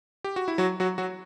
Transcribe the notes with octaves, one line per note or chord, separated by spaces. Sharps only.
G4
F#4
E4
F#3 F#4
F#3 F#4
F#3 F#4